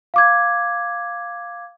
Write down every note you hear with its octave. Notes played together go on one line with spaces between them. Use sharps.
F5 D6 G#6